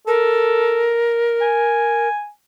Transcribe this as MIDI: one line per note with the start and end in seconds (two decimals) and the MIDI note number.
0.07 0.99 69
0.07 2.08 70
1.42 2.28 80